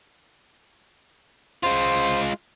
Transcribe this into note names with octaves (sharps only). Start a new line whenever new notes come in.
G#3 F4 C5